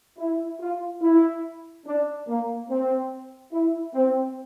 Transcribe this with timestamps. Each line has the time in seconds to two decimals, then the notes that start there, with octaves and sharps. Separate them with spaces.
0.18 E4
0.60 F4
1.01 E4
1.85 D4
2.27 A#3
2.69 C4
3.52 E4
3.95 C4